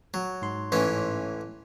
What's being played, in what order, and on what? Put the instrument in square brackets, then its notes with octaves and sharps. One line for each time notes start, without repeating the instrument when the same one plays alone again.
[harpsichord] F#3
[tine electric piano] G#2 C6
[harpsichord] A1 E3 C#4